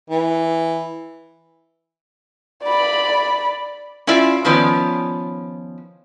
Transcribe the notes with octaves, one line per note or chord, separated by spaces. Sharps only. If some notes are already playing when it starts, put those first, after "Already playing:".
E3
D5 B5
C#4 E4 F4 D5 E5
D#3 F3 B3 C#4 D5